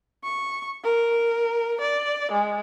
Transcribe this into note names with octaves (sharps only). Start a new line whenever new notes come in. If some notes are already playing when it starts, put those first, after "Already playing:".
C#6
A#4
D5
G#3